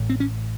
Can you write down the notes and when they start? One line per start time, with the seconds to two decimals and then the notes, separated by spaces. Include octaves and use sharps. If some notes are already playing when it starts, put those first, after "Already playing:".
Already playing: A1 A2
0.09 C4
0.20 C#4